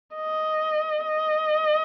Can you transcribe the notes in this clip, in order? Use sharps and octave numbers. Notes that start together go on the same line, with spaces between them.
D#5
D#5